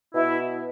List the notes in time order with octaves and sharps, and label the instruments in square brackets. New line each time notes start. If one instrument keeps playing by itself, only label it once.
[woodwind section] B2 E4